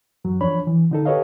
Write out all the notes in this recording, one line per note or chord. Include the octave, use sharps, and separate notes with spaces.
F#2 F#3
E2 F3 D4 C#5 B5
E3
D3 D#4 A4
G4 A4 B4 C#5 D#5 F5